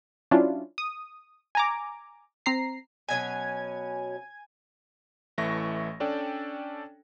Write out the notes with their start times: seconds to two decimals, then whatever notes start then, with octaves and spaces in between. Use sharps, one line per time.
0.31 F#3 C#4 D4 E4 F4
0.78 D#6
1.55 G#5 A#5 D6
2.46 C4 A#5 C7
3.09 B2 F#3 C#4 G#5 G#6
5.38 A1 E3 A3 E5 C#6 A#6
6.00 C#4 D4 A4 D5 G5